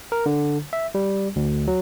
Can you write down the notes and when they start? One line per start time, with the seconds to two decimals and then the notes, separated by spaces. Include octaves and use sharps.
0.12 A#4
0.26 D3
0.73 E5
0.95 G3
1.36 D2
1.68 F#3